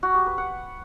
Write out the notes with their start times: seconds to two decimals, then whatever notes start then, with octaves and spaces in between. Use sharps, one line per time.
0.03 F#4
0.14 G4
0.26 B4
0.38 F#5